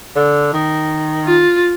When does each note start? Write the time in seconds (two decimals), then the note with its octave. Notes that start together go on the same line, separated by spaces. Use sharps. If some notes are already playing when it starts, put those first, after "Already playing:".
0.16 D3
0.53 D#3
1.26 F4